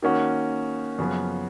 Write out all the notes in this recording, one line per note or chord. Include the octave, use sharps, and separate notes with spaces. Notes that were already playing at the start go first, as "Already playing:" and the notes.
D#3 A#3 C#4 F#4
F#2 C#3 F3 B3